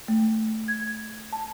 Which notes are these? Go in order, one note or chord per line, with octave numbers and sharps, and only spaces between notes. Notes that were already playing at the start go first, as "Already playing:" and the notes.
A3
G#6
A5